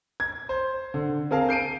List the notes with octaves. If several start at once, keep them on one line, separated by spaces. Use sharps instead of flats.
G#6
C5
D3
C4 G#4 A#4 F5 A5
G6 C7 D7 D#7